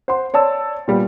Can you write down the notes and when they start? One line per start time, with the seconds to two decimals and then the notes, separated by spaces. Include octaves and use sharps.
0.08 C5 F#5 C6
0.34 C#5 D5 A5 E6
0.88 A#2 G3 B3